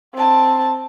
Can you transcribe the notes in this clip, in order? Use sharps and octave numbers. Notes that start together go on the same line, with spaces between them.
C4 A5